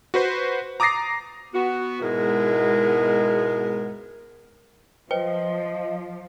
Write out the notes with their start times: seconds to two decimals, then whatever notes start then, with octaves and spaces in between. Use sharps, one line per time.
0.14 F#4 B4 C5
0.80 A#5 D6 D#6 A6 A#6 C7
1.54 B3 F#4
2.01 G#2 B2 G#3 B3 E4 A#4
5.11 F3 B4 C5 D#5 G5